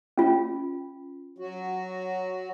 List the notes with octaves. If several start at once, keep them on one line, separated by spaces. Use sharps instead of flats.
C#4 F4
F#3 F#4